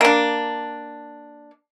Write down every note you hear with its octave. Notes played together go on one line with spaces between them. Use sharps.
A#3 D4